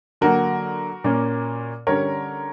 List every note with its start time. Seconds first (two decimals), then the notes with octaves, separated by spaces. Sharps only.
0.21 D3 F#3 A#3 F#4 A#4
1.04 A#2 A#3 C#4
1.87 D3 G3 C#4 A#4 C#5